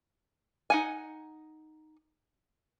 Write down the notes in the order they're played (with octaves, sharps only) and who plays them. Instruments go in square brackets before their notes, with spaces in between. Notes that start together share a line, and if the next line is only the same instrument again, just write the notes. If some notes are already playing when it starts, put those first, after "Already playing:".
[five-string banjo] D#4 F#5 G#5